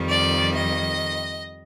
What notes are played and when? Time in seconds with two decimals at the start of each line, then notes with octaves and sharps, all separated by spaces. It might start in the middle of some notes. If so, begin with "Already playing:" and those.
Already playing: F2 D#3 G3
0.09 D5
0.55 D#5